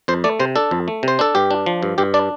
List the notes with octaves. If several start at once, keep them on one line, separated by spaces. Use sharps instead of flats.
F2 C5
A3 D5
C3 C5
D4 A4
F2
A3
C3 C5
D4 A4
G2 G4
D4
F3
G2
G2 G4
D4 D5